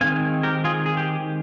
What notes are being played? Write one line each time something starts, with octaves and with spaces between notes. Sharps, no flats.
D#3 G#3 C4 F5 G#5
G4 A#4
F4 G#4
G#4
G4